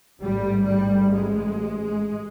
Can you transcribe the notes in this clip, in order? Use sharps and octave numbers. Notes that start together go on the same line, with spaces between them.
A1 G#2 G3
G3
G#3